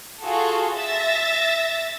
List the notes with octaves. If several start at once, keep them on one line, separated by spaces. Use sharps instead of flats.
F4 F#4 G#4 A4
E5 A6 A#6